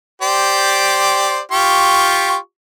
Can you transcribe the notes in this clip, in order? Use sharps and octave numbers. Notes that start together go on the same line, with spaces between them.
G4 C5 D5
F4 G4 C#6